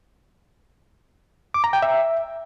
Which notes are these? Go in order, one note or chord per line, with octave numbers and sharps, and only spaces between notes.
D6
A#5
G5
E5